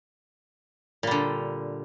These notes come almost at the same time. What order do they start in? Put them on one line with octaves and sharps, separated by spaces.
A#2 G3 D3